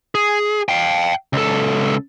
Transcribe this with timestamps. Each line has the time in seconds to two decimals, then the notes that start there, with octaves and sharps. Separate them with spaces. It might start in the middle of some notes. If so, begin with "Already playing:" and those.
0.15 G#4
0.69 F5 G5
1.33 C#2 A4